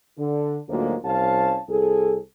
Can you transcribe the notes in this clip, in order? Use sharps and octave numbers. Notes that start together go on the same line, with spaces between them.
D3
D2 G#2 D3 F3 F#3 A#3
C2 C#4 C5 F5 A5
C2 G#4 A4